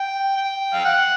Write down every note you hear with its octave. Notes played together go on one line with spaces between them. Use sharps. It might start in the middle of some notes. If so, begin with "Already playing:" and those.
Already playing: G5
G5
F5
F#5